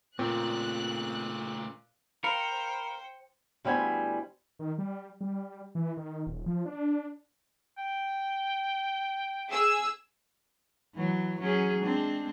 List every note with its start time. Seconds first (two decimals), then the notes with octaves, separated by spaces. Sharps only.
0.19 A#2 C#3 A3 C4 F#6
2.24 A#4 C5 F5 G5 B5 C#7
3.65 D2 G3 B3 E4 C5 G#5
4.59 D#3
4.78 G3
5.21 G3
5.75 E3
5.97 D#3
6.27 D#1
6.46 F3
6.66 D4
7.78 G5
9.50 G#4 E6
10.95 E3 F#3
11.40 F#3 C#4 G#4
11.83 G#3 C4 D4